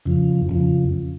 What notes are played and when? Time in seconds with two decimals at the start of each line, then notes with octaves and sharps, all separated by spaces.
0.05 F2 C#3 F3
0.49 F2 C#3 F3